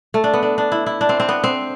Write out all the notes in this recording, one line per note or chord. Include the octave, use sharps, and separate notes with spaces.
A3
D4
B3
D4
D4
E4
E4
D4
C4
C4
B3
C4